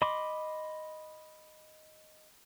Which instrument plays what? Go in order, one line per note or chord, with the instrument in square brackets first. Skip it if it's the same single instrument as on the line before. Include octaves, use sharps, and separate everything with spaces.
[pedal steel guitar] D#5 B5 C6 D6